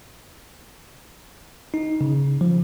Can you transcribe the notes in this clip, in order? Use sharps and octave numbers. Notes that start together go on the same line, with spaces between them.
D#4
C#3
F3